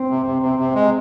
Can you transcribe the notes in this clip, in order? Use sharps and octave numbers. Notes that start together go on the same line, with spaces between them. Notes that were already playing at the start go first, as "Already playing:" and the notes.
Already playing: C4
C3
C3
C3 C4
C3
G#3